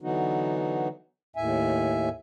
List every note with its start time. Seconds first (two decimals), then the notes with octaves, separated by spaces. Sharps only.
0.01 D3 E3 F#3 B3 D#4 F#4
1.36 D#2 A2 E5 G#5